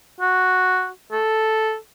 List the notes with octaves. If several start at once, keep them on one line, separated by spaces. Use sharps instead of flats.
F#4
A4